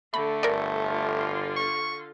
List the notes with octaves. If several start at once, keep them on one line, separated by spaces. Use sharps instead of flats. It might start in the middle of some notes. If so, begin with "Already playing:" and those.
D3 A3 B5
G1 A#4 D5
D3 F4
C#6